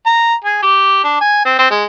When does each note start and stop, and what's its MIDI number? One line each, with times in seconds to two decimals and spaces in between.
0.06 0.34 82
0.44 0.58 68
0.63 1.02 67
1.04 1.20 62
1.21 1.42 80
1.45 1.55 60
1.59 1.70 60
1.71 1.85 56